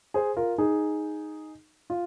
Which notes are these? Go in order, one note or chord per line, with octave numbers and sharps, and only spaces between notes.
G#4 C5
F4 A#4
D#4 G#4
F4